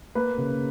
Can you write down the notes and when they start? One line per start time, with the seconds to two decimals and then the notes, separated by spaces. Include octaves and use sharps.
0.15 A#3 B4
0.38 C#3